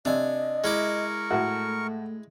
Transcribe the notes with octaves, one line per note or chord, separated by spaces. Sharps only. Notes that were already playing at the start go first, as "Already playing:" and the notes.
C3 D4 D#5 G#5
G#3 E4 A#4 C#6 D6
A2 A3 F#4